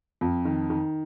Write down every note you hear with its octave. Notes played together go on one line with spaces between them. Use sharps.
F2
D#3
D#3